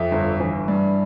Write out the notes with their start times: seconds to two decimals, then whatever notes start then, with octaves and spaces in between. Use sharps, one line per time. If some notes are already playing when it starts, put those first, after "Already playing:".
Already playing: F2 E5
0.11 G1
0.40 E3
0.68 G2